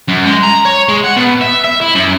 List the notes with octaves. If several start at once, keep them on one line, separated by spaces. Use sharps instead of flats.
F#2
G#3
A#5
C#5
G#3
F#5
B2
E5
E5
E4
F#2